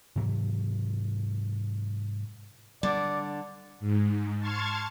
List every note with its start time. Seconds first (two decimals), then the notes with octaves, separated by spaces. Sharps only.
0.16 G#2 C3 E3 F#3
2.83 D3 G3 D5
3.80 G#2
4.39 A5 C6 C#6 F6 G#6 A6